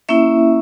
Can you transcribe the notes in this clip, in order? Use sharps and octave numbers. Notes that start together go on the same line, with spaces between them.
A#3 C#4 E4 E5